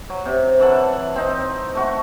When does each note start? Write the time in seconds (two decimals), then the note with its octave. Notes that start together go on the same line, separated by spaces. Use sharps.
0.10 F#3
0.25 C3
0.59 E3 F#3 A4 F#5
1.16 C4 D#4
1.75 A3 F#4